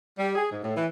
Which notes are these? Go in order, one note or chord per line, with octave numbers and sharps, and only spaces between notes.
G3
G#4
G#2
A2
E3